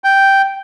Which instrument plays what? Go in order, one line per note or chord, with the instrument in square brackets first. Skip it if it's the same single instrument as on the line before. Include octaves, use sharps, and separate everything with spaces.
[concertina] G5